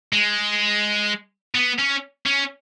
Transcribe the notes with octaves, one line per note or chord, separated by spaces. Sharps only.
G#3
B3
C#4
C#4